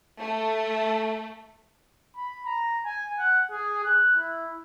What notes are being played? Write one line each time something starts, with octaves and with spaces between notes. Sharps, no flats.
A3
B5
A#5
G#5
F#5
G#4
F#6
E4